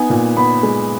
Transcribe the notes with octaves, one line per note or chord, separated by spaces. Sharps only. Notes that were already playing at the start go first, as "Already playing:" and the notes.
Already playing: B3 D#4 G#5
A#2
B3 B5
G#3